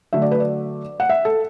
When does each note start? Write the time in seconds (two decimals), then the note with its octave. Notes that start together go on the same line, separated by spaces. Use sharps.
0.13 D3 F#3 A3 D4 E5
0.22 D5
0.31 B4
0.40 D5
1.00 F#5
1.10 E5
1.25 A4